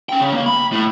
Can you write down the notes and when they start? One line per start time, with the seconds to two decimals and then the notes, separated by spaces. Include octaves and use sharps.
0.09 C#4 G5
0.21 C#3
0.34 A#3
0.46 B5
0.72 A2